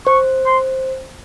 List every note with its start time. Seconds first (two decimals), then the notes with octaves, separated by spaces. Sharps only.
0.06 C5 C#6
0.46 C6